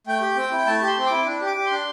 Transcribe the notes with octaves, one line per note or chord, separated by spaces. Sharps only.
A3 G5
G4
C4
E4
A3 A5
G4
C6
C4
E4 D6
D4
G4
D6
G4
C6
D4